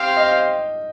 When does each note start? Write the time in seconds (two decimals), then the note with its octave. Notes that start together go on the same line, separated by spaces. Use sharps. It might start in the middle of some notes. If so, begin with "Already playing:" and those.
Already playing: C4 G4 C5 F5 G5
0.17 D#5